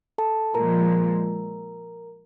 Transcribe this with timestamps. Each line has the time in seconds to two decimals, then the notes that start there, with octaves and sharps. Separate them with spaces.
0.18 A4 A5
0.54 A#2 F3 G#3 A#4 A#5